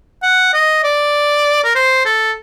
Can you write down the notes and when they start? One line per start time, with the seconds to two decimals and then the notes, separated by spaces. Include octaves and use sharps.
0.23 F#5
0.53 D#5
0.84 D5
1.64 A#4
1.75 C5
2.05 A4